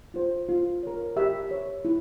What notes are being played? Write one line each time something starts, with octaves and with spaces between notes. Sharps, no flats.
F4 C5
F4
A#4 C#5
G4 E5
C#5
E4